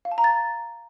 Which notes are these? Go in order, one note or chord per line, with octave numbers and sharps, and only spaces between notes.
F5
A5
A#5
A6